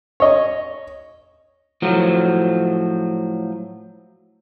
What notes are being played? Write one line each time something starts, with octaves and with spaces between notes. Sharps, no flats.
C#5 D#5
A2 F3 F#3